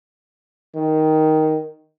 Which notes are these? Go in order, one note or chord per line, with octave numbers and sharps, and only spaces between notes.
D#3